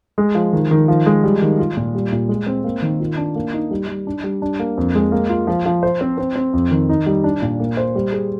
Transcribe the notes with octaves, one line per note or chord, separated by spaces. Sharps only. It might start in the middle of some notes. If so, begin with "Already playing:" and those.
G#3
F3
D#3
D#3
F3
G#3
G3
D#3
F4
A#2
G3
A#2
G#3
C4
A#3
D#3
F4
D4
A#3
D#4
G3
G3
D4
G3
D4
A#3
F2
G#3
A#3
F4
F3
F3
C5
C4
C4
C4
F2
D#3
D#4
G3
D4
A#2
A#3
C5
G3
G#4